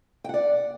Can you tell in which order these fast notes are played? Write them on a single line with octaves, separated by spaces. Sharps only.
G5 F#5 D5